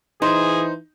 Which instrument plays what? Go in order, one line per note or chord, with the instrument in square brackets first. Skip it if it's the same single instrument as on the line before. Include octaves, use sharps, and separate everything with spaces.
[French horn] E3 [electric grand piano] D#4 [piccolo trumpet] G#4 [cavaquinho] C5